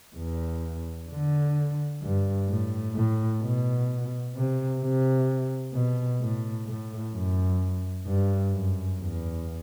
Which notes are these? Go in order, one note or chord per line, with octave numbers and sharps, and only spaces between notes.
E2
D3
G2
A2
A2
B2
C3
C3
B2
A2
A2
F#2
G2
F#2
E2